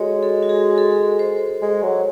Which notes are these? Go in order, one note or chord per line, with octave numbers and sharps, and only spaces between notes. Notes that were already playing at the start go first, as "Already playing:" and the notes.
Already playing: G#3 F#4 G#4 A4 C#5 D#5
A4
F#4
G#4
A4
C5
G#3
F#3